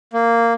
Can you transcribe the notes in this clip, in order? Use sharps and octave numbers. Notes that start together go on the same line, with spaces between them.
A#3